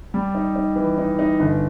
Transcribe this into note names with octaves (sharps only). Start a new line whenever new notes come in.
G3
D#4
D#4
E3
D#4
D#4
G1